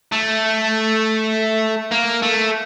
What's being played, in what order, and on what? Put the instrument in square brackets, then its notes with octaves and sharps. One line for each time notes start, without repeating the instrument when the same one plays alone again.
[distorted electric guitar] A3
A#3
A3